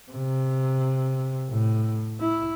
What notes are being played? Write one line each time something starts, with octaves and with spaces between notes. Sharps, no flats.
C3
A2
E4